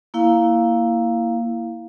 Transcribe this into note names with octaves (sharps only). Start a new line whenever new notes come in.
A#3 E4 F5